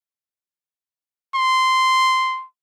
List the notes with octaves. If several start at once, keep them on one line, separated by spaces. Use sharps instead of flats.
C6